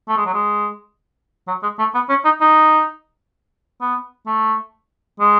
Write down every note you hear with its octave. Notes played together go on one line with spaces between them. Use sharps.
A3
G#3
F#3
G#3
F#3
G#3
A3
B3
C#4
D#4
D#4
B3
A3
G#3